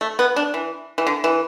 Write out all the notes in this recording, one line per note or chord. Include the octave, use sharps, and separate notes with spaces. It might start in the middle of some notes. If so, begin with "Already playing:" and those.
A3
B3
D4
E3
E3
D3
E3